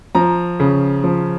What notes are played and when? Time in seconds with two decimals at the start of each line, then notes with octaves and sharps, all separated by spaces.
0.15 F3 A#5
0.60 C#3
1.04 F3